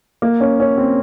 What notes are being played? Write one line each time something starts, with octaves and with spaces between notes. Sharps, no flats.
A#3
C#4
C#4
C4